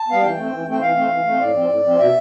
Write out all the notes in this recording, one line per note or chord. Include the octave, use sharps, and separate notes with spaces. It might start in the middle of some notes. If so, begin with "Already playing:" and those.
Already playing: A5
G3 B3 F5
E3 G5
A3 C4
E3
A3 C4 G5
E3 F5
A3 C4
E3
A3 C4
A2 D5
F3 C4
A2
F3 C4
B2 E5